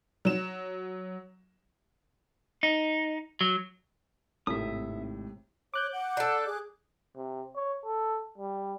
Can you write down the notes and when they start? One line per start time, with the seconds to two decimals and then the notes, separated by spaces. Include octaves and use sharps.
0.25 F#3 E7
2.63 D#4
3.41 F#3
4.47 G#1 A2 C3 E5 D#6
5.74 C#5 D6 F#6 G6
5.93 F#5
6.17 D4 A4
6.47 G#4
7.16 C3
7.56 C#5
7.86 A4
8.38 G3